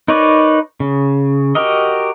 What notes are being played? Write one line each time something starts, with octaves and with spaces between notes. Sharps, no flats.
D#4 A#4 B4 C#5 D5
C#3
F#4 G4 A#4 D#5